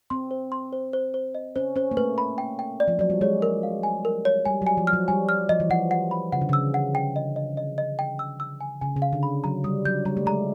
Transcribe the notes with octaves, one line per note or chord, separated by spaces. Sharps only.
C4 C6
C5
C6
C5
C5
C5
D#5
C#4 C5
C#4 C5
A#3
A3 B4
B5
G5
G5
D5
F3
F#3 D5
G3
G#3 C#5
A#4
F5
G#5
A#4
C#5
G3 G#5
F#3
G#5
F3
F6
F#3
G3 G#5
F6
F3 D#5
E3
F3 F#5
F#5
B5
C#3 F#5
D3
C#3 E6
F#5
G5
D#5
D#5
D#5
D#5
G5
E6
E6
G#5
C#3 G#5
C#3
F5
D3
B5
F#3 A#5
G3 D#6
F#3 G6
G3 A#5
A3
G#3 A#5